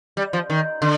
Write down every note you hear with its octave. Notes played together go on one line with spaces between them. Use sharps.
G3
F3
D#3
D3